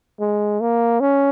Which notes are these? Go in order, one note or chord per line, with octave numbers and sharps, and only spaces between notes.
G#3
A#3
C#4